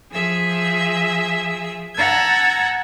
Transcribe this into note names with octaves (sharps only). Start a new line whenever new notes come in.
F3 G#4 E5 E6
F#5 A5 A#5 E6 G#6